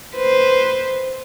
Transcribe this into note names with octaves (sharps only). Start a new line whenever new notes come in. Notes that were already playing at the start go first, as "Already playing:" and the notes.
B4 C5